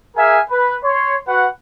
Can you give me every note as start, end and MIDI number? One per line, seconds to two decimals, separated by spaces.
0.16 0.40 68
0.16 0.40 70
0.16 0.40 76
0.16 0.40 77
0.16 0.40 80
0.50 0.75 71
0.84 1.16 73
0.84 1.16 84
1.28 1.47 66
1.28 1.47 71
1.28 1.47 78